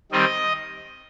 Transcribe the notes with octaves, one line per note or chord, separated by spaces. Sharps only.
D#3 G3 C4 D#5